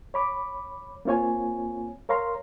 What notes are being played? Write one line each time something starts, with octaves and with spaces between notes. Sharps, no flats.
C#5 B5 D6
A#3 C4 F4 C#5 G#5
A#4 C#5 F5 A#5 C6